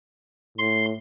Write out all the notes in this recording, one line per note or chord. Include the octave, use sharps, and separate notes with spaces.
A2 C6